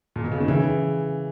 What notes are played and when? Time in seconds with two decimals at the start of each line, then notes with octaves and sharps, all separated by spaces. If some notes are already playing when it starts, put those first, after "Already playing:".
0.16 A#2
0.24 B2
0.32 C#3
0.40 D#3
0.48 C#3 E3